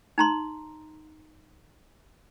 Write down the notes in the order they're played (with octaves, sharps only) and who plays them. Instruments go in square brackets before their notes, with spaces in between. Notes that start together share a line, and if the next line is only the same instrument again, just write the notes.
[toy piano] D#4 A#5 C6